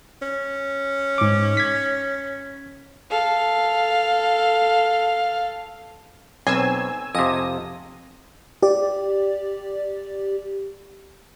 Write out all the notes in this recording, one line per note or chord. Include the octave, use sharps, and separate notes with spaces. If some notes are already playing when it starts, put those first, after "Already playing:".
C#4
G#2 D6
G#6 B6
A4 F5
B1 C4 C#5 G#5 E6
F2 C3 D#5 D#6
G4 D5